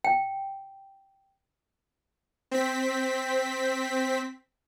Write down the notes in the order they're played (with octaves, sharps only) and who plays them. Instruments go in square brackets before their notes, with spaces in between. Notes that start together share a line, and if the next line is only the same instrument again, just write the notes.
[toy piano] G5
[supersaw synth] C4 B6